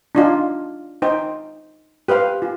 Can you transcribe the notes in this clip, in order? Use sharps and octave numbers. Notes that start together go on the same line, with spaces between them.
D4 D#4 F4
D#4 C5 G5
G4 B4 C5 F5
F4